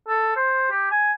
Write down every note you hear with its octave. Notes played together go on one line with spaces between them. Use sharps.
A4
C5
G4
G#5